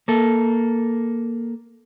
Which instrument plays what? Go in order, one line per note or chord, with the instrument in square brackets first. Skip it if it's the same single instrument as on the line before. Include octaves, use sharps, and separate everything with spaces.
[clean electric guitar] A#3 A4